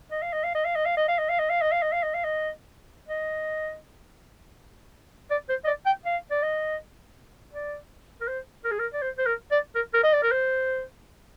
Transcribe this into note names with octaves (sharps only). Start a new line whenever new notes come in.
D#5
F5
D#5
F5
D#5
F5
D#5
F5
D#5
F5
D#5
F5
D#5
F5
D#5
F5
D#5
F5
D#5
F5
D#5
D#5
D5
C5
D#5
D5
G5
F5
D5
D#5
D5
A#4
C5
A#4
G#4
A#4
D5
C5
C5
A#4
D5
A#4
A#4
D#5
D5
A#4
C5